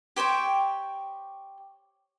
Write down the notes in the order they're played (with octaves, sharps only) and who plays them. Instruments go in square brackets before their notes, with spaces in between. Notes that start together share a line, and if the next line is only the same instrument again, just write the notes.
[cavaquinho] G4 C5 C#5 G5